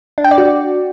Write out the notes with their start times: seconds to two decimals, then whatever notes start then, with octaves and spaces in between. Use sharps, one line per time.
0.18 D4
0.24 G5
0.31 D5
0.38 F#4